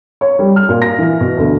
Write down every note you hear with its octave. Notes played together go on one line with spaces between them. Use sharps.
C#5
G3
F6
A#2
A#6
E3
B2
D2